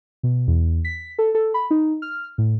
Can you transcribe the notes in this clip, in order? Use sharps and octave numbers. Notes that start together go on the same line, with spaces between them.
B2
E2
B6
A4
A4
B5
D#4
F6
A2